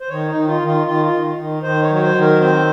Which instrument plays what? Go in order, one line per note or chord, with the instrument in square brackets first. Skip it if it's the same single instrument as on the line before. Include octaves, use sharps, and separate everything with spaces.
[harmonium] C5
D#3 C#5
D#4
D#3
F4
D#3
F4
D#3 F4
F4
D#3
D#3
D#3 C5
C#5
F#3
C#5
C5
D#3
A#4
C4 C5